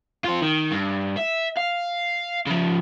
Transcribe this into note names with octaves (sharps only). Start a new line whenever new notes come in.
C4 F4
D#3
G2
E5
F5
C#3 F3